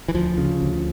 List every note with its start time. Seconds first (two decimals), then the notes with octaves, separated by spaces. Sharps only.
0.08 E3
0.14 D2 F3
0.38 C#3
0.62 D2